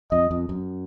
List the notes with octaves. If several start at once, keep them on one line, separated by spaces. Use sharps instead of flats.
F2 D#5
F2
F#2